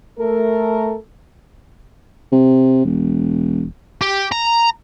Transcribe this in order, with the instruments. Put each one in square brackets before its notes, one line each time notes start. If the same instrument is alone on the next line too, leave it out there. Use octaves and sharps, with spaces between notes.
[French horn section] A3 A4 A#4
[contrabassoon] C3
E1
[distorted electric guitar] G4
A#5